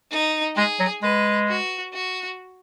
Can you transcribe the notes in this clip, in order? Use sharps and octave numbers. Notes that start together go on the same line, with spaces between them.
D#4
G#3 G#4
F#3
G#3 B4
F#4
F#4